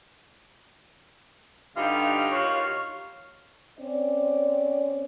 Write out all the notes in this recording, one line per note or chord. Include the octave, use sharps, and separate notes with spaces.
G2 D3 D#4 F4 G4
D#2 D#3 F4 F#4 C#5 F5
C4 C#4 D5